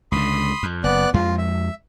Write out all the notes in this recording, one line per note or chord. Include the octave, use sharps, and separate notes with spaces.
C#2 D3 B5 C6 D#6
F2
F#1 B3 D5 F#6
F2 G#3 F4
E5